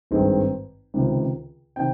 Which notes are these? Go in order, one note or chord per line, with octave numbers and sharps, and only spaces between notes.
G#1 G2 D#3 G#3 C4
C#2 C3 D#3
C3 D#3 G5